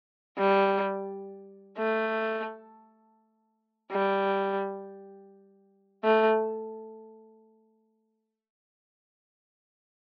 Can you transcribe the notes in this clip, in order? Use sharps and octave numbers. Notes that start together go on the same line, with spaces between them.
G3
A3
G3
A3